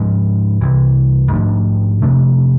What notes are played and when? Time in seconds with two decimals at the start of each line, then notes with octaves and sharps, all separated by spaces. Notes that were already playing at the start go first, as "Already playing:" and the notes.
Already playing: G#2 F3 G#3 D4
0.61 C2 C3 E3
1.32 G#2 F3 A3 D4
2.02 C3 F3 A3 D4